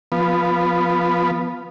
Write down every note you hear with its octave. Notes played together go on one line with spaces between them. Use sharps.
F3 B3